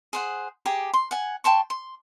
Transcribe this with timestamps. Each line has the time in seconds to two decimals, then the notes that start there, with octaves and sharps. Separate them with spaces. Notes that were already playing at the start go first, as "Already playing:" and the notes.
0.13 G#4 C5 F#5
0.66 G4 G#4 G5 A#5
0.94 C6
1.11 F#5 G#5
1.44 G5 A5 C6 C#6
1.70 C6